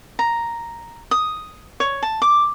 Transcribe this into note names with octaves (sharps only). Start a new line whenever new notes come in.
A#5
D#6
C#5
A5
D6